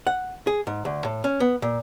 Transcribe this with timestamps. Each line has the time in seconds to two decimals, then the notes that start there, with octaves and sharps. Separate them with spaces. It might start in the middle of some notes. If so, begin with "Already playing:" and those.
0.07 F#5
0.47 G#4
0.67 G#2
0.85 D2
1.05 A2
1.24 C#4
1.40 B3
1.62 A#2